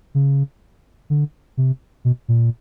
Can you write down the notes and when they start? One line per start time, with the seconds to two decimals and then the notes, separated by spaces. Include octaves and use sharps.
0.15 C#3
1.10 D3
1.57 C3
2.05 B2
2.28 A#2